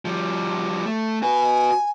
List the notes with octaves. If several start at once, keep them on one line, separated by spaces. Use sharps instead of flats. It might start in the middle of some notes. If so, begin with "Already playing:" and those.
F3 G3
A3
F#4 B4 G#5